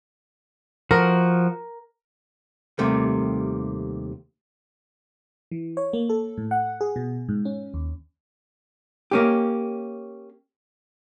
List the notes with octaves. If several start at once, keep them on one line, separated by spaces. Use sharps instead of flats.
F3 F#4 A#4
D#2 C3 G3 A3 A#3
E3
C#5
A#3
A4
A2
F#5
G#4
B2
G#2
C#4
D#2
A#3 C#4 G4